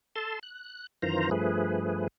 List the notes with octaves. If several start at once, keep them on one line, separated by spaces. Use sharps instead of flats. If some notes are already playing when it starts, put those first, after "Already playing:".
A4 A5 C6
F#6
F#2 D#3 E3 F4 C5 A#5
G2 F3 A3 G#4 B4